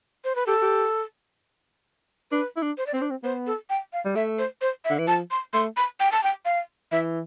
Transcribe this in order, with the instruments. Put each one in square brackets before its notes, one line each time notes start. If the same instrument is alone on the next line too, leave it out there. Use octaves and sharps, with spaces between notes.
[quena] C5
B4
[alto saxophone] G4 [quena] A4
[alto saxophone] G4
[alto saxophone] D4 [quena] B4
[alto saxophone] E4
D4
[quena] C5
D5
[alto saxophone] C4 [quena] C5
[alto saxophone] D4
C4
[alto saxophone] B3 [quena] C5
[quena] A4
G5
F5
[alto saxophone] G3
[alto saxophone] A3 [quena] E5
[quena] C5
C5
E5
[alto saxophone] D3
E3
[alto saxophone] F3 [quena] A5
[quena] C6
[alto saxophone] A3 [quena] C6
[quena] B5
G5
A5
G5
F5
[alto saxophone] E3 [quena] E5